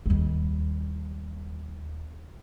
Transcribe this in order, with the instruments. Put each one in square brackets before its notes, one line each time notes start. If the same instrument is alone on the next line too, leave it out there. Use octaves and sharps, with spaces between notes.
[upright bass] D#2 G3